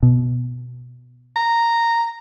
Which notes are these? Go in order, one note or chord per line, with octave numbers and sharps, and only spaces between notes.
B2
A#5